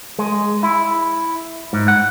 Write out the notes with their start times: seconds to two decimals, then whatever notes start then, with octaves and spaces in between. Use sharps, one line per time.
0.19 G#3
0.63 E4
1.73 G#2
1.88 F#5